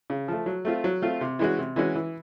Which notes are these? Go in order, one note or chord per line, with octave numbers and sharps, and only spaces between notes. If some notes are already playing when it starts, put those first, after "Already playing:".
C#3
F3 A3
F#3
A3 C4 F4
F#3
A3 C4 F4
C3
E3 G#3 C#4 F#4
C3
E3 G#3 C#4 F#4
E3